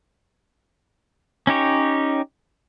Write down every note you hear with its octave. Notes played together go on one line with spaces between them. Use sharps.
C#4 D#4 G4 C#5